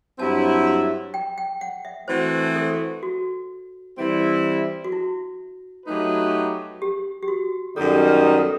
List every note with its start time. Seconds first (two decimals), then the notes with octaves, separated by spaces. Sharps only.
0.19 G2 F#3 C4 E4 A5
0.67 B5
1.14 G5
1.38 G5
1.61 F#5
1.85 E5
2.08 E3 A3 C4 F#4 C5
2.55 A4
3.03 F#4
3.97 E3 G3 C4 E4
4.84 F#4
4.92 E4
5.86 F#3 A3 D#4 G4 B4
6.82 G4
7.23 G4
7.28 F#4
7.76 F#2 D#3 G3 B3 D#4 A4
8.08 B4
8.33 B4
8.38 A4